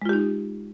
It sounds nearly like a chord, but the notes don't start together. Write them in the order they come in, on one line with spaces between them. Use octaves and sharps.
G#3 F4 G4 D#4